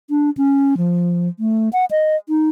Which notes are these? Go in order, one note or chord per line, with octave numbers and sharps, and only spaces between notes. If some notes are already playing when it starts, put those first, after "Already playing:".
D4
C#4
F3
A3
F#5
D#5
D#4